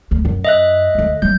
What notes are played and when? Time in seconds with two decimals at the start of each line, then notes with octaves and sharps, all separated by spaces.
0.11 D2 A3
0.25 F#2
0.45 D#5 E5 F#6
0.95 D2 D3
1.22 F#3 C#4 G6